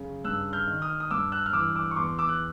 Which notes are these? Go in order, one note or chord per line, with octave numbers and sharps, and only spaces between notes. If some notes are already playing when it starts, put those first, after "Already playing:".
Already playing: F#2 C#3
G2 E6 F#6
F6 G6
D#3
D#6 F6
D#6
G2 D6 E6
E6 F#6
F6
E3 D6 E6
D6 E6
C#6
E2 C6 D6
D6 E6
F#6